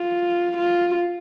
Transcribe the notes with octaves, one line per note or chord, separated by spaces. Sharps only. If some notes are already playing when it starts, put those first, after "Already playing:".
Already playing: F4
F4